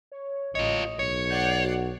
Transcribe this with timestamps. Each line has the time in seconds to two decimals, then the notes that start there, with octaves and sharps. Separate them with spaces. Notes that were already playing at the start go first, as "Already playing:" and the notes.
0.12 C#5
0.55 A1 F4 C#5 D#5
0.99 B1 C#5 C#7
1.30 D5 F#5 G6 C7
1.64 F#4